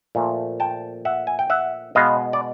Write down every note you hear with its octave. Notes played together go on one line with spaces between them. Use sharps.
A#2 F3 A3
G5 A5
E5 F#5
G#5
G5
E5 F#5
B2 G#3 B3 D#5 F5
D5